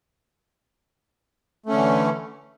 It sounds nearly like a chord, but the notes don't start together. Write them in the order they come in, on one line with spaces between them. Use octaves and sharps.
A3 C#4 D3 E3